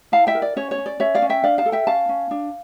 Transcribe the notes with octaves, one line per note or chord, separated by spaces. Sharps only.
E4 F5 A5
E5 G5
A#4
D5
C#4 C#5
C#5
C#4
D5
C#4 C#5 E5
D5 F5
C#4
E5 G5
D4 D5 F5
F5 A5
A4
E5 G5
C#4 F5 A5
C#4
D4